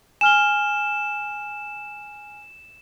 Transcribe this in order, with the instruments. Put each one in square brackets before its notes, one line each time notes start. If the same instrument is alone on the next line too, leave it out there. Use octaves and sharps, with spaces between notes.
[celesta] G#5 F6 G7 [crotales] E7